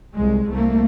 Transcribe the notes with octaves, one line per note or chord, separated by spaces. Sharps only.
C2 G#3
C2 A3 A#3